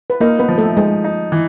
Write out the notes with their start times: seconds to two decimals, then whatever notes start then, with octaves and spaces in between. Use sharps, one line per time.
0.10 B4
0.21 A#3 D#4 A#4
0.39 B3 B4
0.48 F3
0.58 A3 A4
0.76 G#3 D#4 G#4
1.04 D#4
1.32 E3